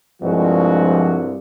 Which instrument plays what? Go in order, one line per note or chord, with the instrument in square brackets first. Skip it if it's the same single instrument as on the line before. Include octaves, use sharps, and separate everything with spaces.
[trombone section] C2 G2 [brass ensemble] F3 G#3 F#4